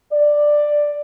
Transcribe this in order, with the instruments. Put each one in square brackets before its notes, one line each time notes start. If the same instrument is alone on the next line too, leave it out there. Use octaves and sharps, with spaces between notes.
[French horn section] D5